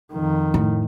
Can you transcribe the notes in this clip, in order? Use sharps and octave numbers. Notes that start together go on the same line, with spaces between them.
F2 D#3
A2